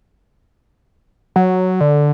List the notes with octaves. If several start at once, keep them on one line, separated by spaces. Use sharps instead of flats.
F#3
D3